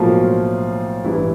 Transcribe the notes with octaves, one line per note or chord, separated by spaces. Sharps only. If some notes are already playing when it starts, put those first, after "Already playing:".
Already playing: B1 A2 F3 F#3 A#3 F4
A1 G2 E3 E4